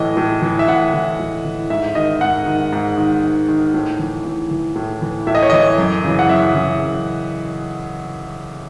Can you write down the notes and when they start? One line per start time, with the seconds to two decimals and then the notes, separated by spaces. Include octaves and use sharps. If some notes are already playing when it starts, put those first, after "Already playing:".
Already playing: A2 E3 D#5
0.17 A2
0.42 E3
0.59 E5
0.68 A2 F#5
0.94 E3
1.19 A2
1.45 E3
1.70 G#2 E5
1.95 D#3 D#5
2.21 G#2 F#5
2.46 D#3
2.72 G#2
2.98 D#3
3.23 G#2
3.49 D#3
3.74 A2
3.99 E3
4.25 A2
4.51 E3
4.76 A2
5.02 E3
5.27 A2 E5
5.35 D#5
5.43 C#5
5.50 E3 D#5
5.78 F#2
6.04 C#3 E3
6.19 F#5
6.29 F#2 E5
6.54 C#3 E3
6.80 F#2